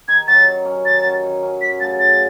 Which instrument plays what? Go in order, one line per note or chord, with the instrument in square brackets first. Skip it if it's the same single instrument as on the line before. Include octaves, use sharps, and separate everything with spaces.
[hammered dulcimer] D#3 [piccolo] G#6
[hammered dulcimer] F#3 C#4 [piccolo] A6
[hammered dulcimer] D#3
F#3 C#4
[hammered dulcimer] D#3 [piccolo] A6
[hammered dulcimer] F#3 C#4
D#3
F#3 C#4
[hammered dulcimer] F#2 [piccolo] B6
[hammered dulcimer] C#3 F#3 A3 [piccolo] A6
[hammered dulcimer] F#2 [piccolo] A6